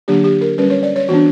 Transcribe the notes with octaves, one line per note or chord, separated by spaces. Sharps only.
D3 F#3 A#3 D4 G4
G4
A#4
G3 C#4 B4
C#5
D5
C#5
E3 B3 D4 F#4